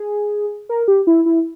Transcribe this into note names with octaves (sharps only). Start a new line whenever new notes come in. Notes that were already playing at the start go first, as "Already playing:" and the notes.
Already playing: G#4
A#4
G4
E4
E4